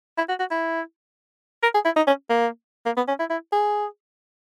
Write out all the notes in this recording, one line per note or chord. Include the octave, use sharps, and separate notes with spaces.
E4
F#4
F#4
E4
A#4
G#4
E4
D#4
C#4
A#3
A#3
B3
C#4
E4
E4
G#4